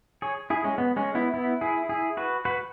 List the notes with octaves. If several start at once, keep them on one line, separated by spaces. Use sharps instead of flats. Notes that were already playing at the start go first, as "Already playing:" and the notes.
G#4 C#5
E4 G#4
G#3 C#4
B3
G#3 C#4
B3 E4
B3 E4
E4 G#4
E4 G#4
F#4 B4
F#4 B4